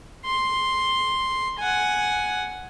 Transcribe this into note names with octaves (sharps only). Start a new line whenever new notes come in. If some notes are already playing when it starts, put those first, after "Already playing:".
C6
F#5 G#5